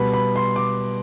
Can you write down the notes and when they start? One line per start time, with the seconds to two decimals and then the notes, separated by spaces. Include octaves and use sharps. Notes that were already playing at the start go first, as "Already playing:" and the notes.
Already playing: B2 G3 B3 B5
0.13 B5
0.36 C6
0.56 D6